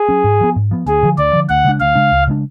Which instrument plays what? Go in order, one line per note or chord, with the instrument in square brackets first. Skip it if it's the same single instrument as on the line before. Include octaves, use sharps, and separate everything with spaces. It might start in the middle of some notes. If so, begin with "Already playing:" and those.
Already playing: [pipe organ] G#4
[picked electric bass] F#3 C#4
G#2
F3 B3
G#2
F3 B3
[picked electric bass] D2 [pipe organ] G#4
[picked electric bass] D3 F3
[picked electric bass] D2 [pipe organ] D5
[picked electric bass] D3 F3
[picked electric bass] D2 [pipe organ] F#5
[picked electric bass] C#3 G#3 D4
[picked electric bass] D2 [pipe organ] F5
[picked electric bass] C#3 G#3 D4
C#2
C#3 G#3 D4